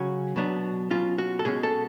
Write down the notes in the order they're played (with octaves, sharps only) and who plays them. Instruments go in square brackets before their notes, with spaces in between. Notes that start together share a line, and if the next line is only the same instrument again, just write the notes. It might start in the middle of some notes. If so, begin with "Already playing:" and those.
Already playing: [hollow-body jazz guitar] C#3 F#3 C#4 F#4
B2 F#3 B3 D4
B2 F#3 C#4 F4
F#4
A4
B2 G#3 C#4 G#4
A4